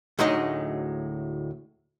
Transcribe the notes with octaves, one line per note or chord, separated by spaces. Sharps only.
D2 A2 F#3 G#3 D#4 D#5